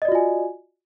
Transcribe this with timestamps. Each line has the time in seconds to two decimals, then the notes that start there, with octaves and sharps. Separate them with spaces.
0.02 D#5
0.05 D5
0.08 F#4
0.12 F4
0.15 G#5